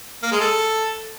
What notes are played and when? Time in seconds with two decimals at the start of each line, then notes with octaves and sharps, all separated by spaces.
0.23 A#3
0.32 G#3
0.41 A4